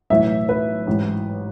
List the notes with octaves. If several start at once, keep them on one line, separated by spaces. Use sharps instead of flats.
B1 A2 E3 E5
B4
A1 G#2 E3